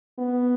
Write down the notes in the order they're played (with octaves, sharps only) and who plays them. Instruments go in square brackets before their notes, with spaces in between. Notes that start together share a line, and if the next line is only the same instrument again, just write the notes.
[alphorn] B3